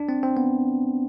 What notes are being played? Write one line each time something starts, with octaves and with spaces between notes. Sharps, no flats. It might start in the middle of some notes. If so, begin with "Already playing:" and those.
Already playing: D4
C4
C4
B3